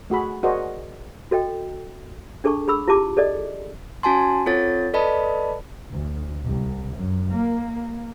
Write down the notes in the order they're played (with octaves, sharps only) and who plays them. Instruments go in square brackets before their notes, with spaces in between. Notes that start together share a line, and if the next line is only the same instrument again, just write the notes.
[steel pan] A3 F#4 G#4 B5
F#4 G#4 A#4 C5 D5 D#5
[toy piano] F#4 A4 D#5 G5
D4 G#4 A4 A5 C#6
G#4 B5 E6
E4 F4 G4 A5 D6
G#4 A4 D5 D#5
[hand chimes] C#4 F#4 G#5 A5 C6
C4 F4 A4 C#5 A6
A4 B4 D5 D#5 A5 B5
[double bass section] D2
C2
F#2
A#3